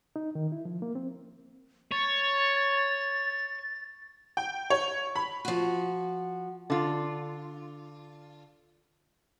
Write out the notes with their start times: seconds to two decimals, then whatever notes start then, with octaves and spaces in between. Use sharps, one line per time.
0.16 D#4
0.35 D#3
0.52 E4
0.65 F3
0.82 A#3
0.95 C4
1.92 C#5 A6
4.37 G5
4.70 C#5
5.16 B5
5.45 F3 F#4
6.70 D3 F4